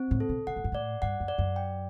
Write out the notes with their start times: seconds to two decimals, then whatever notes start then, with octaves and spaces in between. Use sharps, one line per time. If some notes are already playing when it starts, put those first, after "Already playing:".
Already playing: C4
0.11 A2
0.20 A4
0.29 B2
0.47 B2 F#5
0.56 A2
0.64 G2
0.72 A2 D5
1.02 G2 F#5
1.20 F#2
1.28 D5
1.38 F#2
1.56 G5